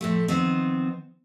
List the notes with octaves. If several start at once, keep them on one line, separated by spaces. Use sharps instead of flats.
A2 F3 A3
D#3 F3 B3 C4